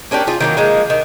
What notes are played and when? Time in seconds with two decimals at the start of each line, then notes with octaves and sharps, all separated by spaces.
0.11 A#3 C#4 D4 G4
0.27 F4 G#4
0.40 D#3 F#3 A#3
0.57 F3 G#3 A#3
0.90 D#3